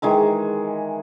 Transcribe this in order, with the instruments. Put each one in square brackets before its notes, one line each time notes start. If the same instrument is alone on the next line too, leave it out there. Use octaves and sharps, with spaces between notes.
[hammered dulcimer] D#3 E3 G#3 A#5